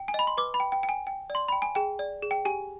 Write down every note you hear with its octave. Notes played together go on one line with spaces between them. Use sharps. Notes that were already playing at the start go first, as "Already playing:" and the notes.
Already playing: G5
G#5
D#5 B5
C6
B4 D6
B5
G5
G5
G5
G#5
G5
D5
C6
G5 B5
G#5
G#4 G5
D5
G#4
G5
G4 G#5